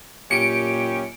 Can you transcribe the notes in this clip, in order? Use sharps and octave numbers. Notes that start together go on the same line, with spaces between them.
F#2 A#2 C#4 G4 C#7 D7